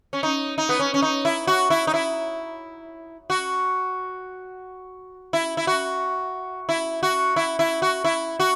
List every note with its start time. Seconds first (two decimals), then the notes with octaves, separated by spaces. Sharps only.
0.13 C#4
0.23 D#4
0.58 D#4
0.69 B3
0.79 C#4
0.94 C#4
1.02 D#4
1.25 E4
1.47 F#4
1.70 E4
1.87 D#4
1.94 E4
3.30 F#4
5.33 E4
5.57 E4
5.67 F#4
6.69 E4
7.03 F#4
7.36 E4
7.59 E4
7.82 F#4
8.04 E4
8.40 F#4